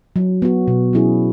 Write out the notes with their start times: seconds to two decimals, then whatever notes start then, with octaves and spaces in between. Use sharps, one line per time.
0.16 F#3
0.42 B3 F#4
0.67 B2
0.93 F#3 C#4 E4 G#4